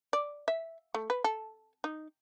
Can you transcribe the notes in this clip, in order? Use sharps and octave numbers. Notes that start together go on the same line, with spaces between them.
D5
E5
A3
B4
A4
D#4